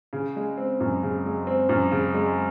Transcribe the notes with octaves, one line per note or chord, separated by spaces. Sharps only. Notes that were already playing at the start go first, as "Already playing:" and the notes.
C#3
G#3
C4
F#2
C#3
G#3
C4
F#2
C#3
G#3